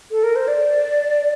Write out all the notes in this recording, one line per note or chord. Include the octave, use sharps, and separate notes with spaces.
A4
A#4
C5
D5